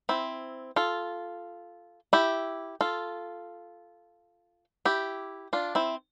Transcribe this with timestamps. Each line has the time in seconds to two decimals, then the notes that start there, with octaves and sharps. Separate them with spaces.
0.09 C4 E4
0.76 F4 A4
2.13 E4 G4
2.81 F4 A4
4.85 E4 G4
5.53 D4 F4
5.75 C4 E4